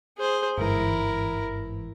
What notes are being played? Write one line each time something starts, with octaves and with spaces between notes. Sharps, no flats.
G#4 C5
G1 G#2 E3 E4 A#4